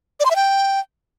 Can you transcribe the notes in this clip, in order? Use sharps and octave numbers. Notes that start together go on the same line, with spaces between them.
D5
C6
E5
G5